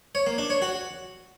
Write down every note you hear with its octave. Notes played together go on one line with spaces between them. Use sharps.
C#5
A#3
D4
C#5
F#4